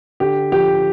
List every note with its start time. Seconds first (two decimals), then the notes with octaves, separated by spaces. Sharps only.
0.20 D3 G4
0.52 F3 G4